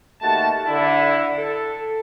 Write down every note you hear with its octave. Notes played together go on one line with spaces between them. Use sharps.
D#2 A3 F#4 A5
D3 E4
A4